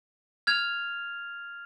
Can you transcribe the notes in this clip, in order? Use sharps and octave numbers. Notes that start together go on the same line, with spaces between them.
F6 G#6 F7